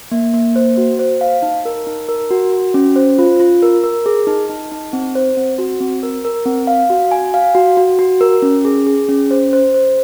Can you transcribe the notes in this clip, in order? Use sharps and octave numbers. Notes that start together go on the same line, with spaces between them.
A#3
A#3
C5
F#4
C5
F5
D#4
A#4
D#4
A#4
F#4
F#4
C#4
C5
F4
F4
A#4
A#4
G#4
D#4
D#4
D#4
C4
C5
C4
F#4
C4
A#4
A#4
C4
F5
F#4
G#5
F5
F#4
F#4
F#4
A#4
C#4
G#4
G#4
C#4
C5
C5
C5